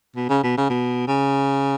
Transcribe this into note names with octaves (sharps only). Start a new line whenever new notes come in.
B2
C#3
B2
C#3
B2
C#3